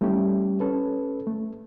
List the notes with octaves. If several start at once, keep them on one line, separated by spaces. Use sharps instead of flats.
G3 A3 C#4 E4 G4
C#4 A4 B4
A3